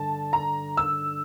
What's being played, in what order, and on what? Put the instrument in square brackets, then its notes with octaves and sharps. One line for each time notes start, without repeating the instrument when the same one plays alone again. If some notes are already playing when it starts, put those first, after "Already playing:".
Already playing: [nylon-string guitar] G2 D3 [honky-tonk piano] A5
[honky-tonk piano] A#5
E6